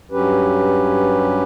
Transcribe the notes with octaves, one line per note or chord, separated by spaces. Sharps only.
G2 F#3 C#4 G4 B4